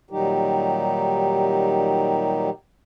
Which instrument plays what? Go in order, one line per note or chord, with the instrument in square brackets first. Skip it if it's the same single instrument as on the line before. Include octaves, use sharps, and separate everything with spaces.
[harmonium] A#2 D#3 F#3 G3 D#4 G4